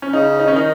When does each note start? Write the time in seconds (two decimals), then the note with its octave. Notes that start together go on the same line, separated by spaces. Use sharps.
0.02 C#4
0.13 C#3 D#4
0.40 D#4
0.48 C#4
0.52 D#3 D#4